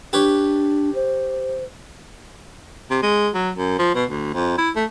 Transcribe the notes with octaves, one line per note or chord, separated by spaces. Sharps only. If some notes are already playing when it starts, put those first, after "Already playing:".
D4 G4 B4 C#5
C5
C3
G#3
F#3
F#2
F3
B2
D2
F2
E4
A3